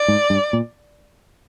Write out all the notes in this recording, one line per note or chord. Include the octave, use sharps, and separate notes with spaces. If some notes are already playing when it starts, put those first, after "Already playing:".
Already playing: D5
G#2
G2
A#2